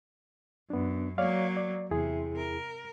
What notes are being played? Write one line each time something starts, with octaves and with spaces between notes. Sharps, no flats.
F#2 B3 D4
F#3 A#3 C#5 D5 F5
D5
E2 C3 E4 G#4
A#4